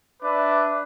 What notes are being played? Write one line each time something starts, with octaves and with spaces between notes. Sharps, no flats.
D4 B4 E5 D6